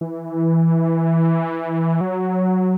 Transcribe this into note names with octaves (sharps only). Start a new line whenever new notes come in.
E3
F#3